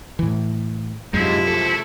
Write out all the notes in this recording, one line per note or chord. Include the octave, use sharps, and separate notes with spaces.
A2 E3
F#2 C3 F3 G#3 D#4 E4
G#3 A4